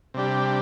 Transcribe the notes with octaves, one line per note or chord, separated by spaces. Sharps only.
C3 G3 D4 G4